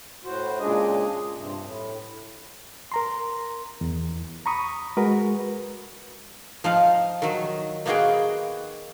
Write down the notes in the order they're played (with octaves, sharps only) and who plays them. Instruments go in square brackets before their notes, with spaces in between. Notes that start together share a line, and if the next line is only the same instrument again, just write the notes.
[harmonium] A2 F#4 C5
A#2 C#3 G#3 D4 G#4 D#5
G2 C3
A2
[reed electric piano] A#4 A#5 C6
E2
A#5 B5 C#6 D#6
G#3 F#4 A#4 B4
[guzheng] F3 D#4 F5
D#3 F#3
A#3 B3 D#4 F#4 G#4 G5